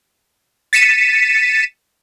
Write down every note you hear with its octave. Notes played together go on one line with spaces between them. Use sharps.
A6 B6 C#7 D#7 E7